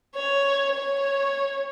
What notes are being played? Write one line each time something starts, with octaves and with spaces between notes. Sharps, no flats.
C#5
C#5